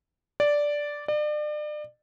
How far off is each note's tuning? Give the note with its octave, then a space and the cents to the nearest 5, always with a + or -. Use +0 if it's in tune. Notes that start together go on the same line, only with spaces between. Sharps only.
D5 -5
D5 +35